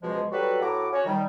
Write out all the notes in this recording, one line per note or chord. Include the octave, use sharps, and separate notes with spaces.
C#2 B2 F3 G#3
F#3 G3 F#4 A4 B4
A2 F#4 A#5 D6
C#4 F#4 C#5
D#3 G3